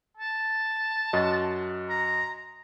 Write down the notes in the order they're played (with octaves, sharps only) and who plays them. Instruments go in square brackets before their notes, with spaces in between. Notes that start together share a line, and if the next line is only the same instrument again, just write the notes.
[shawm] A5
[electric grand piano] F#2 F#4 D#5
[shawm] A#5